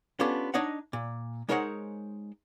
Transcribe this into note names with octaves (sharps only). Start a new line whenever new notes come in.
B3 C#4 D4 F4 G4 A4
D4 D#4 C#5 D#5 F#5
A#2
G#3 D#4 A#4 C5 C#5 F#5